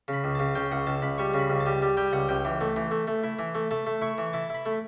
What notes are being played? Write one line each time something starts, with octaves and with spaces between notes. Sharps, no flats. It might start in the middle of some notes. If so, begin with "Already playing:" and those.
C#3 B5
C#2
C#3 A5
C#3 G5
C#2 F#5
C#2 A5
C#2 B5
G3 C#6
C#3
B5
C#2
A5
G3
G3
G3 G5
C#2 F#5
C#2 G5
E3
A3
E3
A3
A3
E4
E3
A3
A3 A5
A3
E4 C#6
E3
E4 A5
E4 B5
A3